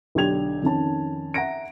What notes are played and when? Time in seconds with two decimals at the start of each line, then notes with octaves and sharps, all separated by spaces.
0.15 B1 D3 G4 G5 G#6 F7
0.62 F2 D#3 C#4 A5
1.34 E5 F#5 A#5 A#6 D7